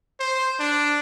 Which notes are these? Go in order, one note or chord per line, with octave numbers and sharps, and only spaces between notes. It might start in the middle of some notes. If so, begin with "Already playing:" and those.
C5
D4